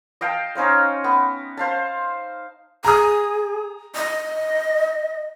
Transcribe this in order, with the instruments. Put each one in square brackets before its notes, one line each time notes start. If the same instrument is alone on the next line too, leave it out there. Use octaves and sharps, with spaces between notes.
[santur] D#5 F5 G5 A5
C#4 D#4 C5 F5
B3
C5 F5 A5
[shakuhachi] G#4 [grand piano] A#5 D#6
[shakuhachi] D#5